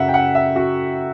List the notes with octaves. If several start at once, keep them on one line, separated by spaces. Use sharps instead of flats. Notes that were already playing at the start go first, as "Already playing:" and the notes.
Already playing: F#2 C#3 F#3 E5 F#5
G5
F#5
E5
F#4